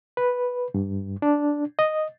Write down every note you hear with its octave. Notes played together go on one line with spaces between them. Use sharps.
B4
G2
D4
D#5